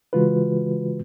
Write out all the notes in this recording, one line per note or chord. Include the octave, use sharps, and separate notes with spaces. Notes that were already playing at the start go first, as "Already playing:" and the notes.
C#3 E3 G#3 F4 F#4 B4